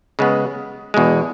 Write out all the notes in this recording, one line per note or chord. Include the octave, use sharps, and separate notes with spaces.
C#3 G#3 B3
E2 B2 G#3